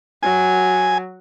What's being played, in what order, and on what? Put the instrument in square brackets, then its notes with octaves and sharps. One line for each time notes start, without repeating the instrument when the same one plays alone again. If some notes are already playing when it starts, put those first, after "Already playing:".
[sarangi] F#3 [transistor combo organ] G#5